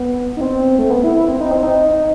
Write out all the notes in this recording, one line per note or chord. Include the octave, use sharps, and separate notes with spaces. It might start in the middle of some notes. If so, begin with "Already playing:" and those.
Already playing: B3
D#4
C4
A3
B3
E4
E4
C4
D#4
C4
D#4
D#4